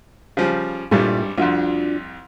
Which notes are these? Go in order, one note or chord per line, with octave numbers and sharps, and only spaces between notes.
C#3 F3 G3
G#1 G2 A#2 G3 E4 A4
C2 F2 D4 F4 F#4